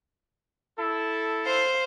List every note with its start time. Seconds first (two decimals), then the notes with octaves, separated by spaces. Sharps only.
0.78 E4 A4
1.46 C5 F5